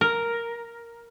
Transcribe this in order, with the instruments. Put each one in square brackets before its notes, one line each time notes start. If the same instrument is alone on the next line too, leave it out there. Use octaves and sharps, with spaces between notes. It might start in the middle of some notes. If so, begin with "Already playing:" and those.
[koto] A#4